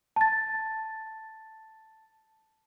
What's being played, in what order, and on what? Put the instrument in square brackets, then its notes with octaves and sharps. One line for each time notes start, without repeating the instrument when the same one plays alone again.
[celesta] A5 A6